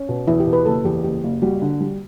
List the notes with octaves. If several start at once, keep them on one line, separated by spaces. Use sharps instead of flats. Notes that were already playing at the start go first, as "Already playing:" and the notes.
Already playing: C#4
B2
E2 E4
G4
B2
B4
F#1 A4
E2 G4
F#1 G4
F#1
G3 F#4
D3
G3